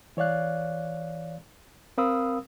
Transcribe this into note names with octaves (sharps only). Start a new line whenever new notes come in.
E3 C#5 D5 F5 F#6
C4 A#4 F5 B5 D#6 E6